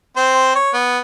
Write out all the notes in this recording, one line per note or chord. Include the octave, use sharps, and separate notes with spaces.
C4 C5
C#5
B3